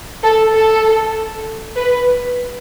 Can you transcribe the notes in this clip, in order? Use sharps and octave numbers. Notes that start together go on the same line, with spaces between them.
A4
A4
B4